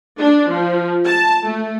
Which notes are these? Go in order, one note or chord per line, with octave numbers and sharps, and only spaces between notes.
D4
F3
A5
A3